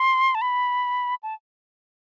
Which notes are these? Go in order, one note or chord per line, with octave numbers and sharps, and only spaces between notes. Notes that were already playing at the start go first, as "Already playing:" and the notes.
Already playing: C6
A5
B5
A5